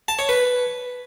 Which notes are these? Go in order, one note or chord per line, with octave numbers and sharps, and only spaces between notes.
A5
C#5
B4